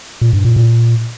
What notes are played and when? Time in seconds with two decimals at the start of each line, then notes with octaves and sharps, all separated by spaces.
0.22 A#2
0.33 G2
0.45 A#2
0.56 A#2